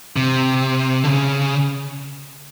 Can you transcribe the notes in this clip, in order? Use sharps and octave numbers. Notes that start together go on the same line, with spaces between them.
C3
D3
C#3